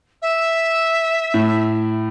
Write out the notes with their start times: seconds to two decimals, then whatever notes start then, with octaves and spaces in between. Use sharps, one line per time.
0.22 E5
1.34 A2